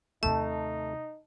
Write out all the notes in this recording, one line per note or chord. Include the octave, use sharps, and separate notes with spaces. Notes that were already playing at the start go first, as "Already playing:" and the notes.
D#2 C3 A3 D#4 A5